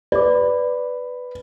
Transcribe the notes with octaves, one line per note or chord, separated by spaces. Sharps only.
B4 D5 D6